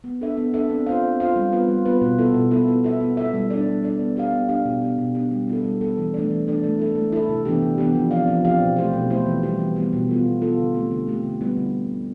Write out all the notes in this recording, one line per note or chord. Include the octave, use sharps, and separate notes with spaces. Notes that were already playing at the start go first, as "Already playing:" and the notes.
B3
D4 A4 E5
B3
D4 A4 E5
C4
F4 C5 F5
C4
F4 C5 F5
G3
B3 F4 B4
G3
B3 F4 B4
B2
B3 E4 A4
B2
B3 E4 A4
B3
E4 A4 E5
B3
E4 A4 E5
G3
D4 A4 D5
G3
D4 A4 D5
B3
D4 G4 D5 F5
B3
D4 G4 D5 F5
B2
B3 D4 G4
B2
B3 D4 G4
G3
B3 E4 A4
G3
B3 E4 A4
E3
A3 D4 A4 D5
E3
A3 D4 A4 D5
A3
E4 A4
A3
E4 A4
C3
E3 B3 D4 G4
C3
E3 B3 D4 G4
F3
C4 G4 D5 F5
F3
C4 G4 D5 F5
B2
A3 E4 G4 C5
B2
A3 E4 G4 C5
E3
G3 B3 E4 G4
E3
G3 B3 E4 G4
B2
B3 F4 A4
B2
B3 F4 A4
D3
A3 C4 G4
D3
A3 C4 G4
D3
G3 B3 E4
D3